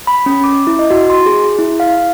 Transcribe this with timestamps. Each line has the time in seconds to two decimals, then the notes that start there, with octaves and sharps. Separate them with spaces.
0.07 B5
0.26 C#4
0.44 D6
0.67 E4
0.79 D#5
0.91 F#4
1.10 C6
1.26 G#4
1.59 E4
1.80 F5